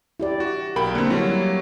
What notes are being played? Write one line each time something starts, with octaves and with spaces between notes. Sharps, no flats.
E4 G4 D5
F#4
B1 A#4 G5 B5
D3 A#3 C4
F#3 G3 E4 F#4 C#5